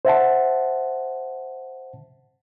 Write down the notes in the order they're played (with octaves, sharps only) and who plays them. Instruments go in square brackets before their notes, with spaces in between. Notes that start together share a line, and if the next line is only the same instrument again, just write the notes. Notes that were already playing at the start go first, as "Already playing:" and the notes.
[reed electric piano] C5 E5 F#5 A5